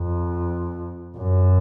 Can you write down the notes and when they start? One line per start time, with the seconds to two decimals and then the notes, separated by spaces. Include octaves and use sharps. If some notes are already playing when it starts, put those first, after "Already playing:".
Already playing: F2
1.17 F#2